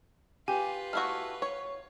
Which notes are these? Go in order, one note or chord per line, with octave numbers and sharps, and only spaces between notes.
F4 G4 B4 G#5
A3 E4 F#4 C#6 E6 F6
C#5